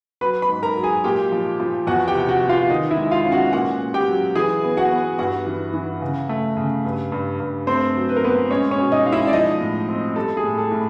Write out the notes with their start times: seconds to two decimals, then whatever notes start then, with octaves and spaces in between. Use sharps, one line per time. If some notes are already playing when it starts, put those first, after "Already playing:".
0.21 F#3 B4 B5
0.42 B4 B5
0.49 G#2
0.63 A#4 A#5
0.77 F#3
0.83 G#4 G#5
1.04 A#2 G4 G5
1.32 F3
1.60 F3
1.87 E2 F#4 F#5
2.08 G4 G5
2.15 C3
2.29 F#4 F#5
2.42 E2
2.49 F4 F5
2.70 D#3 D#4 D#5
2.91 E4 E5
2.97 G#3
3.11 F4 F5
3.25 C#4
3.32 F#4 F#5
3.53 A#2 F#4 F#5
3.81 A#2
3.94 G4 G5
4.09 F#3
4.35 E3 G#4 G#5
4.63 B3
4.77 F#4 F#5
4.91 B3
5.19 G2 F#4 F#5
5.46 E3
5.74 E3
6.01 C#3
6.29 A3
6.57 C#3
6.85 G2
7.12 G2
7.40 G2
7.67 A3 C4 C5
7.95 F#3
8.09 B4
8.16 A#4
8.23 A#2 B3 B4
8.50 G#3 C#4 C#5
8.71 C#4 C#5
8.78 B2
8.92 D#4 D#5
9.05 G#3 F5
9.12 E4 E5
9.27 D5
9.33 F3 D#4 D#5
9.60 A2
9.89 C4
10.16 G3 A4
10.37 G#4
10.44 A2
10.58 A4
10.71 A2